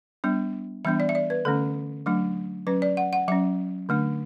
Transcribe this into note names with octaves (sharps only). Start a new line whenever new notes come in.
G3 B3 D4
E3 G3 B3 D4 E5
D5
E5
D5
B4
D3 A3 C#4 A4
F#3 A3 D4
F#3 C#4 B4
D5
F#5
F#5
F#3 C#4 E5
D3 A3 D4